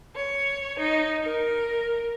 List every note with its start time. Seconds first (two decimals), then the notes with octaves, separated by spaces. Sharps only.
0.15 C#5
0.78 D#4
1.22 A#4